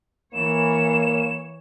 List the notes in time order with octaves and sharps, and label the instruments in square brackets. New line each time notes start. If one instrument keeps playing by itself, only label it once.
[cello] E3 C#5 [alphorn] A#3 [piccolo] E7